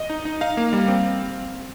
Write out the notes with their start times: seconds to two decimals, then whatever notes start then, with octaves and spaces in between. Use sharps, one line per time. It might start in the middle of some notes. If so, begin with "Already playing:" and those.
Already playing: D#5
0.10 D#4
0.25 D#4
0.41 D#4 F5
0.57 A#3
0.73 G3
0.88 C4